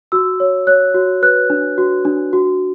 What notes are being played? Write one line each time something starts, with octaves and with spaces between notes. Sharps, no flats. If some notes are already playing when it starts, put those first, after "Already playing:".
F#4 E6
C#5
C#5 F#6
F#4
B4 F#6
D4
F#4
D4
F#4